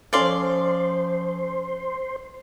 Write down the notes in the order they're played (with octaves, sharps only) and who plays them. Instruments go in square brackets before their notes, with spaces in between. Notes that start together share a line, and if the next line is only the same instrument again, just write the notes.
[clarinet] F3 [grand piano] C#4 A4 A6 [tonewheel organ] C5 [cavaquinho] D5 F5 C6